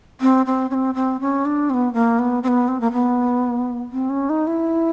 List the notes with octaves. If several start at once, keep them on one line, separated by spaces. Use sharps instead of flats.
C4
C4
C#4
C4
C4
C#4
D4
C4
B3
A#3
B3
C4
B3
C4
A#3
B3
C4
C#4
D#4
E4